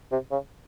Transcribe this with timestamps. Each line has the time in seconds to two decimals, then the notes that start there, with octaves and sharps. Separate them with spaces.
0.12 C3
0.31 C#3